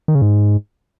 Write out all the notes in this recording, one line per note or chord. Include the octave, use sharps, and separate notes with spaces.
D#3
C#3
G#2